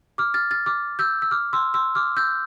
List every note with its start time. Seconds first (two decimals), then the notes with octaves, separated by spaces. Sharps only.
0.18 D6 F6
0.34 F6 A6
0.51 F6 A6
0.66 D6 F6
0.99 E6 G6
1.22 E6
1.31 D6 F6
1.53 C6 E6
1.74 C6 E6
1.95 D6 F6
2.17 E6 G6